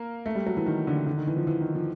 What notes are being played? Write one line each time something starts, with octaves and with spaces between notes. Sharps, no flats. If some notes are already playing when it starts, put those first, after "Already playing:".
Already playing: A#3
A3
G3
F#3
E3
D#3
D3
D3
D#3
E3
F3
E3
D#3
F3